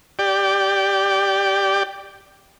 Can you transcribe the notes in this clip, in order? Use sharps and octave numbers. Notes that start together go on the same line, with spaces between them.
G4 D5